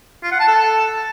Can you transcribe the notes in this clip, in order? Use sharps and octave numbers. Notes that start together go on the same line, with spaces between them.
F4
F#5
A5
A4